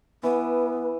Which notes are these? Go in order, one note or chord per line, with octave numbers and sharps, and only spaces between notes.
E3 B3